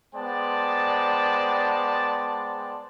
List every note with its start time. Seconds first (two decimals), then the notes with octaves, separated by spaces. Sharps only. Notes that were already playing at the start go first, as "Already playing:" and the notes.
0.15 G#3 B3 C5 D5 G5 A5